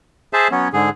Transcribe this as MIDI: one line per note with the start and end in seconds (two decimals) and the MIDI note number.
0.33 0.48 68
0.33 0.48 72
0.33 0.48 76
0.33 0.48 81
0.51 0.68 54
0.51 0.68 59
0.51 0.68 61
0.73 0.89 44
0.73 0.89 50
0.73 0.89 68